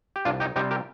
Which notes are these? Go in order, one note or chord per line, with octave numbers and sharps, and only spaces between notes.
G4
C2 D4 F4
D#4 G4
C3 G3 C4 D#4 G4
G4 A#4